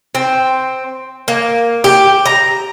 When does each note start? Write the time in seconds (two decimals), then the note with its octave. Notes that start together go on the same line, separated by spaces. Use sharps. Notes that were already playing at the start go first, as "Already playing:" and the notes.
0.15 C4
1.28 A#3
1.84 G4
2.26 A#5